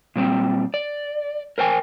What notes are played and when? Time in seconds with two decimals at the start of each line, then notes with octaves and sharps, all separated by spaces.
0.16 A#2 G3 C4
0.74 D5
1.58 A#4 C5 G5 G#5